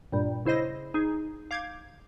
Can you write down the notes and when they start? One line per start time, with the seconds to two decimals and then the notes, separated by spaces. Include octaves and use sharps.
0.12 G2 A#2 G3
0.45 C#3 E4 C5 D#5 A#6
0.94 D#4 G#4
1.51 F5 D6 G6 G#6